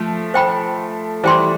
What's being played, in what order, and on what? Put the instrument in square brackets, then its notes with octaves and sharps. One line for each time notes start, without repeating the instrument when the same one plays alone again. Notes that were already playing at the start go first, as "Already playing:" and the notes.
Already playing: [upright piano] F3 A3
[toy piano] C5 G5 B5
[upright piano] E3 G3 [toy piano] C5 G5 C6